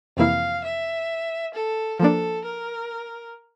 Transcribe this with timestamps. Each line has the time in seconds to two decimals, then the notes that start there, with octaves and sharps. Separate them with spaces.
0.17 F2 C3 E3 A#3 E4 F5
0.63 E5
1.54 A4
1.99 F3 A#3 D4 A4
2.45 A#4